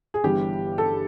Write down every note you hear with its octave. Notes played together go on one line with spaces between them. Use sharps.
G#4
G1 G2 E3 G3 G4
A4